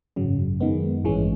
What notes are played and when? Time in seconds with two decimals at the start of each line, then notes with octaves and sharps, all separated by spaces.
0.16 G#1 F#2 C#3 F#3
0.60 F#2 D#3 G#3 B3
1.04 A1 G2 E3 G#3 C#4